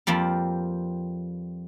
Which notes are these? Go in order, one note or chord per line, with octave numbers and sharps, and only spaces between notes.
F2 F3 G3 A#3